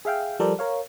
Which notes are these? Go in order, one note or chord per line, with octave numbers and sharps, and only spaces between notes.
G#4 E5 F5 G5
F3 G3 A4 A#4 C5 D5
A#4 C#5 F5